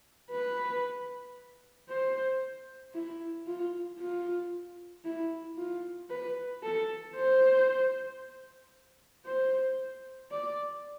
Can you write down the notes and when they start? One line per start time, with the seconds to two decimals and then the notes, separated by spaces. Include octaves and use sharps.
0.31 B4
1.89 C5
2.94 E4
3.47 F4
3.99 F4
5.04 E4
5.57 F4
6.10 B4
6.63 A4
7.15 C5
9.26 C5
10.31 D5